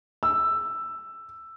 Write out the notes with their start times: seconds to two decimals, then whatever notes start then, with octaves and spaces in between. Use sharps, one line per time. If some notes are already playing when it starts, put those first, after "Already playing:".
0.23 E6